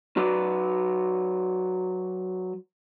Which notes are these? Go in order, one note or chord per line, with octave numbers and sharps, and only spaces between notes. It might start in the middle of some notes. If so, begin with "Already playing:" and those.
F#3 F#4 B4 D5